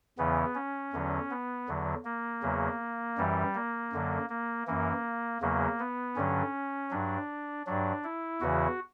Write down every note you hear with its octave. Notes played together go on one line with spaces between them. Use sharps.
E2 C#3 E3 B3
C#4
E2 D3 F#3
B3
E2 D3 F#3
A#3
E2 C#3 F#3
F#2 E3 G3
A#3
F#2 D3 F#3
A#3
F#2 E3 A#3
E2 C#3 F#3 A#3
B3
G2 D3 F#3 C#4
G2 F#3 D4
G2 F#3 D4
E4
E2 C#3 E3 F#4